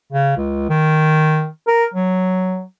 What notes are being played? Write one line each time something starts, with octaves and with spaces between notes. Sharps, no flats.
C#3
C#2
D#3
A#4
F#3